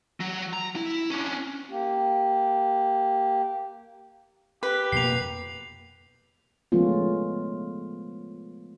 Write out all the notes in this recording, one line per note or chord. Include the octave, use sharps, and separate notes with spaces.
F#3
A#5
E4
C#4 D4
A#3 G4
G4 B4
F2 B2 A#3 C7 F7
F3 G#3 A3 B3 C#4 F4